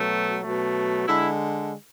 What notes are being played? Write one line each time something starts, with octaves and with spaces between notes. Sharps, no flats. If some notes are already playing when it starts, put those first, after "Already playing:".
Already playing: B2 F#3 A3
B2 F#3 A3
D3 G#3 E4